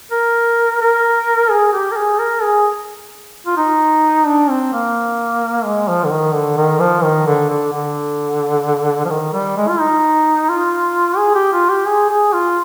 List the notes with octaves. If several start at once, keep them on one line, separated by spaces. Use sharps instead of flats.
A#4
A#4
G#4
G4
A#4
G#4
A#4
G#4
F4
D#4
D4
C4
A#3
G#3
F3
D3
D#3
D3
D#3
F3
D#3
D3
D3
D3
F3
D#3
G3
G#3
F4
D#4
F4
G#4
G4
F4
G4
G#4
G#4
F4